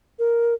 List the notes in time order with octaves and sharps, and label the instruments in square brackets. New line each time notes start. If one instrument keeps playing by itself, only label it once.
[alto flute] A#4